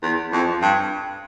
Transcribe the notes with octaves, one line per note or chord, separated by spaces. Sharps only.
E2
F2
G2